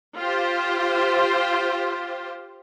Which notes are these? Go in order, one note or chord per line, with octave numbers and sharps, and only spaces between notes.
F4 G4 C5